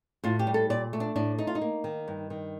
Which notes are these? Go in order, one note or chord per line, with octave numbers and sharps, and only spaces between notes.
A2 F4
G4
G3
A4
A#2 D5
A3
D4
A2 D4
A3 D#4
F4
D#4
A#3
D#3
G2
D#3